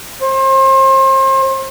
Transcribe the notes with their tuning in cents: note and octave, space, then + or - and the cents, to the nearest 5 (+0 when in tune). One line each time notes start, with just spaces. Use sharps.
C5 +35